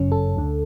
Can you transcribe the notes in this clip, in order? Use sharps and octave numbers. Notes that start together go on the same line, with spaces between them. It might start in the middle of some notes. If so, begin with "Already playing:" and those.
Already playing: G1 F#2 C#3 C#4
A4
D2 D3